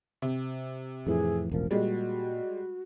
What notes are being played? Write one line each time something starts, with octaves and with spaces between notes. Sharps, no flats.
C3
F2 A2 E3 G#4
E1 A1 F3 A#4
A#2 G3 G#3 F#4